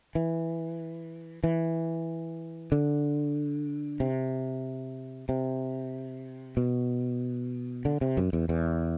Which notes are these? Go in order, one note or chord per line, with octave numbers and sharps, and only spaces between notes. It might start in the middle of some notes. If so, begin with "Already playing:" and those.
E3
E3
D3
C3
C3
B2
D3
C3
F#2
E2
E2